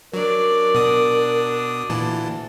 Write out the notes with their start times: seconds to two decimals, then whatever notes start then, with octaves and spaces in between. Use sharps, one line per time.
0.14 F#3 D4 A#4 D5
0.75 B2 D#6
1.89 D2 A#2 E3 A5